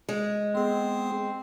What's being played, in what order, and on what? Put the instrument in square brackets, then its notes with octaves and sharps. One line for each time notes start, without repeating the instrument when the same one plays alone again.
[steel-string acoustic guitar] G#3
[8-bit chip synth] B3 G#4 [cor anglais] C4